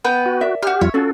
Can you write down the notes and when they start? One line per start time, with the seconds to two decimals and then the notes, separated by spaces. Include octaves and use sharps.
0.05 B3 B4 G5
0.26 F#4
0.41 A#4 D5 E5
0.63 F#4 G4 F6
0.81 F2 G3 F4 C#5 E5
0.94 C#4 F4 F#4 A4